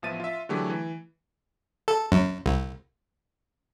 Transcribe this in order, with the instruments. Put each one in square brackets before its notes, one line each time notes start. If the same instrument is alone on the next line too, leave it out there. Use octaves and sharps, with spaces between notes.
[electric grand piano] A1 F3 B3 E5 A6 D#7
F4 E5
D3 E3 F#3 A3 G4 G#4
E3
[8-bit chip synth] A4
F#2
C2